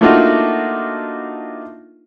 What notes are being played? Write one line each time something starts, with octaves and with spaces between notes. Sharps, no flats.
A3 A#3 D4 D#4 F4 F#4